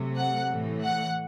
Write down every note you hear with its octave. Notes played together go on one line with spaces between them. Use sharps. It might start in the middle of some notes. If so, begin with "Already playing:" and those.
Already playing: C3 F#3 A3
F#5
A2 E3 A3
F#5